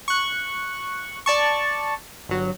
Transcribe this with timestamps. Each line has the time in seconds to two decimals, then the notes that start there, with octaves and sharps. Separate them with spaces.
0.08 C#6 F#6
1.26 D5 A5 C#6
2.29 G1 F#3